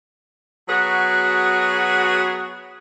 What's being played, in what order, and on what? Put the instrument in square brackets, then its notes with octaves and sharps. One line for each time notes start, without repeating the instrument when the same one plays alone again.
[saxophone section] F#3 B3 F#4 G#4 B4 C#5